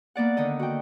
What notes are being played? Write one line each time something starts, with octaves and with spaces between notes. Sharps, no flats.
A#3 B3 D5 F#5
D3 D#3 D#5
F#4 G5